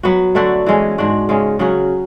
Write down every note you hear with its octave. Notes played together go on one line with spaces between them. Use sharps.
F#3 B3 F#4
D3 A3 D4 F#4
E3 G#3 C#4
G#2 G#3 D4 F#4
C#3 G#3 C#4
C#3 F#3 C#4 F#4